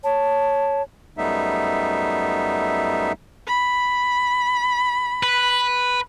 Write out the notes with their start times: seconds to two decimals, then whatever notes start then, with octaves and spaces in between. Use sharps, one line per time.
0.04 C#5 A5
1.18 F#2 G3 A3 B3 D#4 E5
3.47 B5
5.23 B4